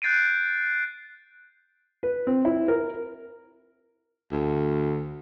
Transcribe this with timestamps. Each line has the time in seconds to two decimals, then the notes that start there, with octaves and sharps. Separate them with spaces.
0.02 F#6 G6 A6 C7 D7 D#7
2.03 B4
2.27 C4
2.45 E4
2.68 A#4
4.32 D2